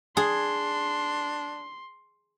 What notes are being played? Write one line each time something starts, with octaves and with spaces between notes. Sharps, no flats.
D4 G#4 C6